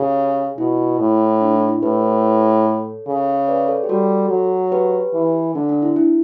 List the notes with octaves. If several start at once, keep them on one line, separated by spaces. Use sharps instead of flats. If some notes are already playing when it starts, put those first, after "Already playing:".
Already playing: C#3 G4
B2 E4
A2
D4
E4
E4
A2 G4 B4
A4 C#5
C#3
B4 D5
A4 C#5
G4
G3 F#4 A4
F#3
G4 B4
E3
D3 D4
D4
E4
E4